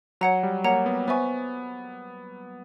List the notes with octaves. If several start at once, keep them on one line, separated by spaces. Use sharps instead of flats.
F#3 C#5 F#5 A#5
G3
A#3 C#5 F#5 A#5
B3
B3 C5 E5 G#5 C#6